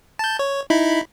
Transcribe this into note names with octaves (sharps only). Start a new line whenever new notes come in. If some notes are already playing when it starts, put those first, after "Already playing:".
A5 G6
C#5
D#4 E4 B5